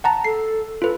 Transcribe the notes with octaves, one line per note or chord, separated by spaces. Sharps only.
F#5 A5 A#5
A4 C7
F4 A4 B4